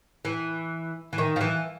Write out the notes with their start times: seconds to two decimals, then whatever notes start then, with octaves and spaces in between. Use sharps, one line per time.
0.25 E3
1.13 E3
1.18 D#3
1.36 F3
1.41 E3